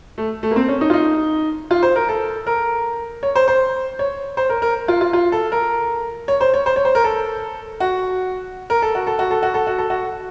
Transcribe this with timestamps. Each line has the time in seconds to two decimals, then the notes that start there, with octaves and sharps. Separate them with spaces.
0.18 A3
0.43 A3
0.51 A#3
0.56 C4
0.69 C#4
0.81 D#4
0.90 F4
0.93 D#4
1.71 F4
1.83 C5
1.96 A#4
2.09 A4
2.47 A#4
3.23 C#5
3.36 C5
3.48 C5
3.99 C#5
4.37 C5
4.50 A#4
4.62 A#4
4.88 F4
5.01 F4
5.13 F4
5.32 A4
5.52 A#4
6.28 C#5
6.41 C5
6.54 C#5
6.66 C5
6.76 C#5
6.85 C5
6.95 A#4
7.04 A4
7.80 F#4
8.70 A#4
8.82 A4
8.95 F#4
9.07 A4
9.19 F#4
9.31 A4
9.43 F#4
9.54 A4
9.67 F#4
9.78 A4
9.90 F#4